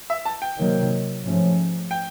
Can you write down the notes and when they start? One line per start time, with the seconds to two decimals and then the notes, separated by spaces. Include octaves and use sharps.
0.10 E5
0.25 A5
0.42 G5
0.58 C3 D#3 F#3 A#3
1.24 G#2 F3 A3 C#4
1.91 G5